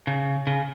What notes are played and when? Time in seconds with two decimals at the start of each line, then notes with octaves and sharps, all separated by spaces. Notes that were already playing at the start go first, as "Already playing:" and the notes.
0.07 C#3
0.47 C#3